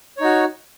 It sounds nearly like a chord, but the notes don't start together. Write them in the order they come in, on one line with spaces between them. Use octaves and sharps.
C#5 D#4 F#4